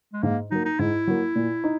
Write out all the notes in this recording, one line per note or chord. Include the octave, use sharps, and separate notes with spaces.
G#3
G#2 A#3
F#3 A#3 D#4
D#4
G#2 E4
F#3 A#3
A#2
D#4